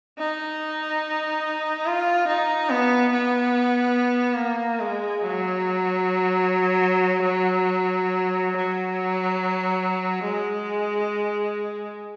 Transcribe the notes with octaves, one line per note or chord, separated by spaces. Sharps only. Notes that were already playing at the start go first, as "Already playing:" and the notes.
D#4
F4
D#4
B3
B3
A#3
G#3
F#3
F#3
G#3